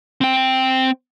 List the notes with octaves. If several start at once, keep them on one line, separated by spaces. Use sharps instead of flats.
C4 G5